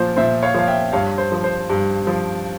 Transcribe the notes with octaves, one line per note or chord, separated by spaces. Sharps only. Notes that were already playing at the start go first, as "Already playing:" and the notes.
Already playing: A#2 F3 C5
A#2 C5 E5
C#5 F5
F3 F5
E5 G5
G2 C#5 F5
C5
F3
C5
G2
F3